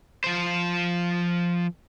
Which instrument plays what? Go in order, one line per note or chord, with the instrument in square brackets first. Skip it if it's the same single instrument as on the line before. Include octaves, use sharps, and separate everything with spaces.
[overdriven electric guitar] F3 C5